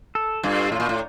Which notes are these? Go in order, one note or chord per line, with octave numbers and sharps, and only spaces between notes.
A4
G2 F4
A2 F4
A#2
A2